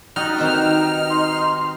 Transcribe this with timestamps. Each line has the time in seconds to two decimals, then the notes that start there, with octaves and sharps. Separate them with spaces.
0.16 G3 D#4 F#4 F6
0.36 D#3 C4 B4
1.10 C6